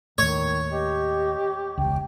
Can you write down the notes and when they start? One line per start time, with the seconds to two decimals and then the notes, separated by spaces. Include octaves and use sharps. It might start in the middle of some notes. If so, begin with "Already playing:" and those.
0.18 D#2 A2 D#3 C#5
0.71 G4 D#5
1.78 E1 C#2 G5